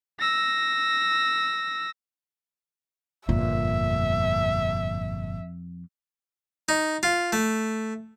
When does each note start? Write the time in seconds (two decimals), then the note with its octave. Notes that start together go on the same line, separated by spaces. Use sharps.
0.20 E6 A#6
3.29 G1 F2 A#2 E5
6.69 D#4
7.03 F4
7.33 A3